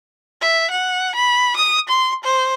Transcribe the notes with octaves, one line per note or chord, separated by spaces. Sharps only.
E5
F#5
B5
D#6
C6
C5